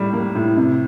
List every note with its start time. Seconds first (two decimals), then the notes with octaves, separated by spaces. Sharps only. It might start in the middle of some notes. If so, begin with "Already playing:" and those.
Already playing: A2 G3
0.13 A#3
0.35 A2
0.57 C3